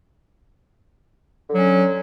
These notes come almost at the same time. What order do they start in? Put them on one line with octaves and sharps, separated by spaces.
D3 F#3 C#4